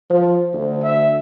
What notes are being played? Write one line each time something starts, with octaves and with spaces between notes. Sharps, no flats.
F3 C5
D2
E5